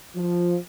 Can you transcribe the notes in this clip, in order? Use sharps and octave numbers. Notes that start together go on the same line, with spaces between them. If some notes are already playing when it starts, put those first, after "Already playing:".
F3